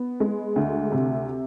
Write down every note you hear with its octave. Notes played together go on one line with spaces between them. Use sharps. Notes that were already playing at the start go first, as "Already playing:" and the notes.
Already playing: B3
G#3
D2
C3